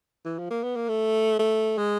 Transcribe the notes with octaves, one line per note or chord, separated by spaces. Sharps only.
E3
F3
A#3
B3
A#3
A3
A3
G#3